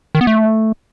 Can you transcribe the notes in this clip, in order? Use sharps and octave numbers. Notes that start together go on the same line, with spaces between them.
D#3
B3
A3